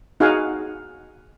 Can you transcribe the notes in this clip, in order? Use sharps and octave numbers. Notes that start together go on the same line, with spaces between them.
D#4 F#4 G#4 F5 F#5 G#5